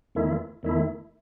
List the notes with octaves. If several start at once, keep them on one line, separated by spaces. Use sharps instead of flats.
E2 D#3 A3 E4
E2 D#3 A3 E4